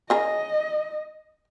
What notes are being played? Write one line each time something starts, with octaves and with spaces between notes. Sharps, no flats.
C#3 G#4 A#4 D#5